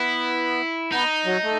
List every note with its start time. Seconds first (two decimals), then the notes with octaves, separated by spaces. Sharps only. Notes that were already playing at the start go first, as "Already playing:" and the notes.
Already playing: B3 E4
0.92 B3 D#4
1.25 F#3
1.43 A3